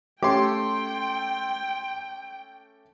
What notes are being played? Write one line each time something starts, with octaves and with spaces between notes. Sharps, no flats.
A3 C#4 G4 A4 G5 C6 D6